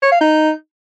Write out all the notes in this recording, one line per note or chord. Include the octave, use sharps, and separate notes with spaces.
C#5
F5
D#4